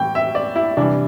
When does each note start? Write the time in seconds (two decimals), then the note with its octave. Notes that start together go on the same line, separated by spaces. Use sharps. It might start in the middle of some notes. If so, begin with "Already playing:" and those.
Already playing: A2 E3 G3 G5
0.15 E5
0.35 D5
0.56 E4
0.77 C3 E3 G3 D4